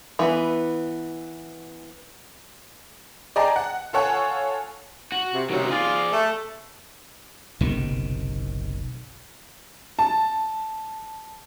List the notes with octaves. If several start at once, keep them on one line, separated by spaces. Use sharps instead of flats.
E3 B3
G#4 D5 D#5 G5 A5 A#5
F#5
F4 A4 C#5 F#5 G#5
F#4
C3
C#2 C3 D#3 F#3
F4 G#4 D5
A3
F#1 B1 C3 D#3
A5